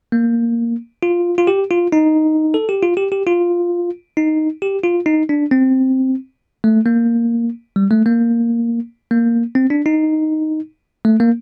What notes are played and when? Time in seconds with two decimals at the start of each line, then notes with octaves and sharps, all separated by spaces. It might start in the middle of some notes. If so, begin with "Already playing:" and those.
0.12 A#3
1.03 F4
1.38 F4
1.47 G4
1.71 F4
1.92 D#4
2.54 A4
2.69 G4
2.82 F4
2.97 G4
3.12 G4
3.27 F4
4.17 D#4
4.62 G4
4.84 F4
5.06 D#4
5.29 D4
5.51 C4
6.64 A3
6.86 A#3
7.76 G3
7.91 A3
8.06 A#3
9.11 A#3
9.55 C4
9.70 D4
9.86 D#4
11.05 A3
11.20 A#3